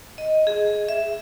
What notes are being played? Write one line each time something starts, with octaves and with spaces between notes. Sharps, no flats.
D#5
G#4
E5